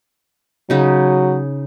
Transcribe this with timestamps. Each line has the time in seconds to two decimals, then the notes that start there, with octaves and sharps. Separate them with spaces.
0.70 C#3 F#3 D#4